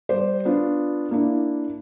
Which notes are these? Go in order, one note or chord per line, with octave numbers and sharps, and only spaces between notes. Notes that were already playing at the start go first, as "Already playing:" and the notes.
G3 C5 D5
B3 D4 F4
A#3 D4 E4